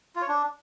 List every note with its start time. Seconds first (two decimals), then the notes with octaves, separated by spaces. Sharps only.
0.16 F4
0.22 C#5
0.28 D4